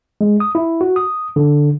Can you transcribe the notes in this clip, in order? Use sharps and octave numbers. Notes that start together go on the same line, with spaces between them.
G#3
D#6
E4
F#4
D#6
D3